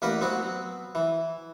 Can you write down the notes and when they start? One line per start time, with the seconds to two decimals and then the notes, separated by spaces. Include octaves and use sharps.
0.02 A1 A#3 A#4 B4 D5 F#5
0.21 F#3 B3 C4 F#4
0.95 E3